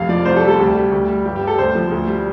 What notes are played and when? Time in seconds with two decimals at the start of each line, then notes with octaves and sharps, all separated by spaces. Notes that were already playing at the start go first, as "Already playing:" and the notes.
Already playing: F1 F5
0.09 F3 D5
0.25 C2 C5
0.36 A4
0.43 G3
0.48 A4
0.59 D2 G4
0.76 G3
0.92 D2
1.08 G3
1.25 G1 G4
1.36 G4
1.42 G3
1.47 A4
1.58 D2 C5
1.75 F3
1.91 D2
2.07 G3